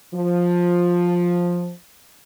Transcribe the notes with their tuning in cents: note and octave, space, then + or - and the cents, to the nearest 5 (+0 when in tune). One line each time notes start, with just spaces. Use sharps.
F3 +10